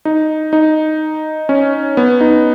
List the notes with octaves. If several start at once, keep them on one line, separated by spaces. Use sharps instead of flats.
D#4
D#4
C#4
B3
D#4